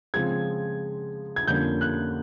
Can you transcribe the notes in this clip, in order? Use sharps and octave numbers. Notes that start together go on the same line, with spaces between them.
C#3 F3 G#3 C4 G#6
G#6
F2 D3 G3 A#3 C#4 G6
F#6